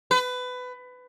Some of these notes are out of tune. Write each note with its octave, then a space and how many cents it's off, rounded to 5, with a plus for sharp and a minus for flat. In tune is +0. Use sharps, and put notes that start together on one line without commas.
B4 +20